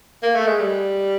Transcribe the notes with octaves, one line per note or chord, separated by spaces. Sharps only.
A#3
A3
G#3
G3